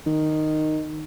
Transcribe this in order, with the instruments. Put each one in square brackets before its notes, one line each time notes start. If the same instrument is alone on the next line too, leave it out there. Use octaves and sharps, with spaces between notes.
[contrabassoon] D#3